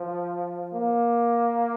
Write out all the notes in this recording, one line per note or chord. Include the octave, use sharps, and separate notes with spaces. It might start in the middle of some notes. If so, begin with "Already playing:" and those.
Already playing: F3
A#3